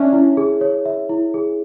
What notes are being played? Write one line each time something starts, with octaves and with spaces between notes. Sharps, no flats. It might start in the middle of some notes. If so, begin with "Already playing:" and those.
Already playing: C#4 D4 C#5 E5
E4
G#4
C#5
E5
E4
G#4